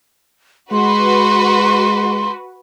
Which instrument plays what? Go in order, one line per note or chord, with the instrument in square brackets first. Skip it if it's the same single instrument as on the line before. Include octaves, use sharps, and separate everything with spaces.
[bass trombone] G#3 [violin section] F#4 B4 [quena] C6